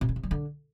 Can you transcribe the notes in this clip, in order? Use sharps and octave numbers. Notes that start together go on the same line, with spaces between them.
B2
C#3
C3
F#3
D3